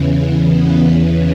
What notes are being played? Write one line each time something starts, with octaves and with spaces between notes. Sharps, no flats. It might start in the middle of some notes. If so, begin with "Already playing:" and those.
Already playing: E2 C#3 E3
B3
B3